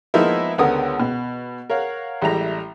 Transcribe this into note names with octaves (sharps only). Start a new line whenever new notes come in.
F3 G#3 A#3 B3 D#4 E4
C#2 D3 G#3 B3 A#4 D#6
B2
A#4 C#5 F5 F#5
A1 G3 G#3 E5 A#5